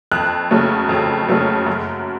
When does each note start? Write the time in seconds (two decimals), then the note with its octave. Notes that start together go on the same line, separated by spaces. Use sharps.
0.12 F2 F#6
0.51 C#3 F#3 A3
0.89 F2
1.29 C#3 F#3 A3
1.67 F#2